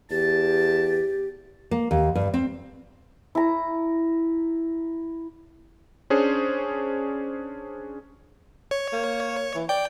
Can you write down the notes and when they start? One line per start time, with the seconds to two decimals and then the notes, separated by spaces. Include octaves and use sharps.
0.11 E2 G4 A5
1.71 A#3
1.91 D#2
2.15 G2
2.34 C4
3.35 E4 A#5
6.10 C#4 D4 G#4 C5 C#5
8.71 C#5
8.92 A#3
9.55 E3
9.69 D5 G5